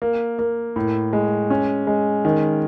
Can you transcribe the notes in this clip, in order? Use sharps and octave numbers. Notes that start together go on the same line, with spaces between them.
A#3
A#3
A2
G#3
C#4
G#3
D#3